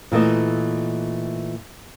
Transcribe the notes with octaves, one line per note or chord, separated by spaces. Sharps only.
A#2 E3 A3 D#5